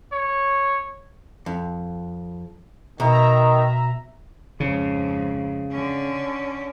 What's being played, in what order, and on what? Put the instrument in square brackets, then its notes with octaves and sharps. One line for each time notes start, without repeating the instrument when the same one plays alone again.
[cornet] C#5
[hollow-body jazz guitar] F2
[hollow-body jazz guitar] B2 [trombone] D#3 [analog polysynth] E5 A#5
[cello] F2 G#2 [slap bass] C#3
[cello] D3 C#4